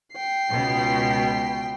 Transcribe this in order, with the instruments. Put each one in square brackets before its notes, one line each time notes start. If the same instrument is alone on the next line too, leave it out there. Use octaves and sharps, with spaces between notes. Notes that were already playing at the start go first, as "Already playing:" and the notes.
[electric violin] G5 C7
[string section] C#2 B2